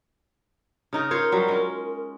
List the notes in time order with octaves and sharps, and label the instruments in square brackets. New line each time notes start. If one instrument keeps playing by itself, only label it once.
[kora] C#3 D#4 A#4
[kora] F4 C5 C#5 [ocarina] A#4
[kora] F#3 G3 F4
G#3 C#4